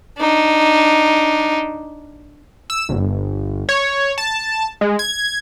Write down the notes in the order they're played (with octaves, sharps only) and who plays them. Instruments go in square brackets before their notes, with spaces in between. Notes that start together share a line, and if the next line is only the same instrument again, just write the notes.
[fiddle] D4 D#4
[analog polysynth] E6
G1
C#5
A5
G#3
G#6